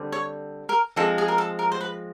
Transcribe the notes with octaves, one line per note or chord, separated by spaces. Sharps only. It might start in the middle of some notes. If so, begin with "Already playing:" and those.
Already playing: D3 G3 C4
C#5
A#4
F3 G#3 C4 A4
G#4
A#4
A4
A#4
C5
B4